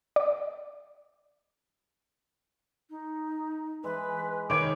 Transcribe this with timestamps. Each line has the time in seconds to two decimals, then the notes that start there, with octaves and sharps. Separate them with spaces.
0.16 D5
2.90 D#4
3.84 E3 G#3 B4
4.50 D#3 B4 C#5 D6